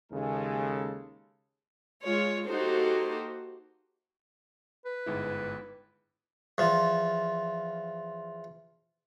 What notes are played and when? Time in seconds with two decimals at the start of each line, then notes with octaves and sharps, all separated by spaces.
0.12 D#2 C#3 G#3 A4
2.05 G#3 F4 C#5
2.46 A#3 D#4 F#4 G4 A4 C5
4.86 B4
5.06 G1 G#2 E4
6.58 E2 F3